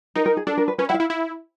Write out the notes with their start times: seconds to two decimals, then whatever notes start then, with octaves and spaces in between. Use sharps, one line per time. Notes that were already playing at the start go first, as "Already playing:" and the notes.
0.15 D#4 A#4
0.26 A#4
0.37 G#4
0.47 D4 A4
0.57 A#4
0.68 B4
0.78 C#4 B4
0.89 E4 F#5
0.94 F5
1.00 E4
1.10 E4